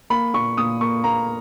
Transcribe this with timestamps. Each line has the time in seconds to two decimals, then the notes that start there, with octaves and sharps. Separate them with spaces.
0.10 A#3 B5
0.34 A#2 C#6
0.58 A#2 D#6
0.81 A#3 C#6
1.04 A#3 A#5